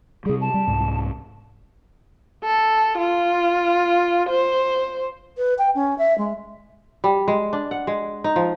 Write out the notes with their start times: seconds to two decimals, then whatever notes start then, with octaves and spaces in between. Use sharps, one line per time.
0.26 C3 G3 G#4
0.41 A5
0.54 G3
0.68 C2 G#2
2.44 A4
2.98 F4
4.29 C5
5.37 B4
5.58 G5
5.75 C#4
5.98 E5
6.18 G#3
7.04 G3
7.28 G#3
7.53 D4
7.71 F#5
7.87 G#3
8.24 D#4
8.36 F3